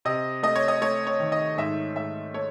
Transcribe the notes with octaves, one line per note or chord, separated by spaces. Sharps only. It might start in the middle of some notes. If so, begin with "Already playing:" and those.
C3 D#5
A3 D#5
C#5
D#5
A3 C#5
C#5
D#3
D#5
G#2 E5
G#2 E5
A3 C#5